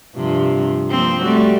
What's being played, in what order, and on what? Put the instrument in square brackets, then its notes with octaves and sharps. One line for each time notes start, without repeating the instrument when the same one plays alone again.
[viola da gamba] G2 C3 F3
F3 A#3 C4
G3 A3 F#4